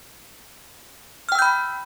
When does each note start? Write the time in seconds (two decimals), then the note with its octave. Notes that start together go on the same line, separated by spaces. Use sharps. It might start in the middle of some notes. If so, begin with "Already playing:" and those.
1.29 F6
1.32 G5
1.35 E6
1.39 G6
1.42 B5